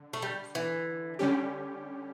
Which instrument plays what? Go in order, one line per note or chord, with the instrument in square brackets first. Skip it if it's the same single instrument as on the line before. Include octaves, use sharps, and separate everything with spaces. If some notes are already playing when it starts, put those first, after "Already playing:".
Already playing: [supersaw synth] D3
[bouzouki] A3
G3
E3
[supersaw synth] D3 G3 C#4 G4